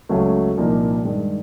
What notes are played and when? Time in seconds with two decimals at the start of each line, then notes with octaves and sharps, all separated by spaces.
0.09 C#2 C#3 F#3 A3
0.57 C2 A#2 F3 A#3 D#4
1.05 G2 D#3 G#3